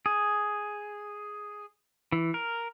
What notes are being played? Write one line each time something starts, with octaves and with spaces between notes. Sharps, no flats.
G#4
E3
A#4